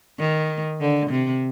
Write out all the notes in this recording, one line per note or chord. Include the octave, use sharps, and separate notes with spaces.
D#3
D3
C3